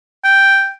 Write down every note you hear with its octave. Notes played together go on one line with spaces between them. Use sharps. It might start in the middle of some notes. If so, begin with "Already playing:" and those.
G5